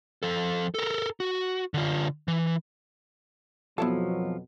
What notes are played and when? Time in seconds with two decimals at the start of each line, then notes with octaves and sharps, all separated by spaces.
0.23 F3 A4
0.75 A4 A#4
1.20 F#4
1.74 D3 F4
2.28 E3
3.78 F2 B2 F3 F#3 B3 E4 A4